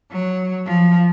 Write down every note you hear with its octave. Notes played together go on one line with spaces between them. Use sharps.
F#3
F3